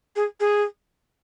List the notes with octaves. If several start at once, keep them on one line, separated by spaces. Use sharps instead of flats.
G#4
G#4